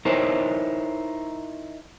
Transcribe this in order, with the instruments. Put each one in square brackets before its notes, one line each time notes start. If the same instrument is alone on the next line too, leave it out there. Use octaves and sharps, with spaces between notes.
[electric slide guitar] D#4 E4 A#4 C5 C#5